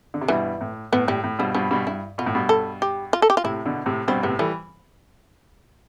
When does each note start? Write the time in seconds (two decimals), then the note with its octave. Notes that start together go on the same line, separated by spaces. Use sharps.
0.14 D3
0.21 C3
0.28 G2 B2 E3
0.61 A2
0.92 A2 B3
1.08 A2 G3
1.24 A2
1.39 G2 B2 F3
1.55 G2 B2 F3
1.71 G2 B2
1.87 G2 E4
2.18 B2 F4
2.26 A2
2.35 G2 B2
2.49 A4
2.82 G4
3.13 F4
3.22 A4
3.30 G4
3.37 F4
3.44 A2 C3 E4
3.65 B2 D3
3.86 A2 C3
4.08 G2 B2 C4
4.23 A2 C3 B3
4.39 E3 G3 A3